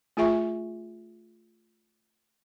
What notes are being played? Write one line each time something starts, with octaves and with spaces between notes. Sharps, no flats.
A3 F4 G#4 E5 G#5 C#6